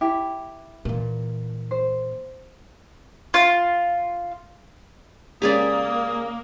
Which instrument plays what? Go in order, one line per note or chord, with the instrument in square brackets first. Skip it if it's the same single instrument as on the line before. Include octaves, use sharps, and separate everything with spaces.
[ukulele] E4 G4
[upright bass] A#2 E3
[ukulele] C5
[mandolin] F4
[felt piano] C#3 G#3 C#4 [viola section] A#3 [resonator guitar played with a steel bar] G4 G#4 D5 [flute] D#6